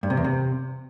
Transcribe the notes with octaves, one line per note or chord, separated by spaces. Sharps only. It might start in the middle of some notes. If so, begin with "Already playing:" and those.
G2
C3
E2
C3